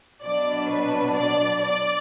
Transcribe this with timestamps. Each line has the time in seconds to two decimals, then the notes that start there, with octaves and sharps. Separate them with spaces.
0.23 B2 F#3 D4 D5
0.69 B4
1.17 D5
1.62 D5